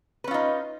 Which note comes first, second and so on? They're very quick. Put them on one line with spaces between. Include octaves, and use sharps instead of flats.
B4 C#4 F4 D#4